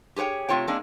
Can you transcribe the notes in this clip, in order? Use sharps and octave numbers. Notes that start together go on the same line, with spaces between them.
G4 G#4 B4 C#5 G5
C3 A3 F4 C#5 G5
G#3 A#3 C4 D4